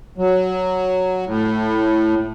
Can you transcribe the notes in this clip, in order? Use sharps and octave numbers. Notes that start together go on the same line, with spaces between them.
F#3
A2